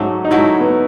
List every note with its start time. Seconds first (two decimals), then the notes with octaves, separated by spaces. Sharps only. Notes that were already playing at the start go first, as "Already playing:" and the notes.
Already playing: G#2 F#3 A3 C#4
0.25 D#4
0.31 G#2 F#3 A3 E4
0.60 B3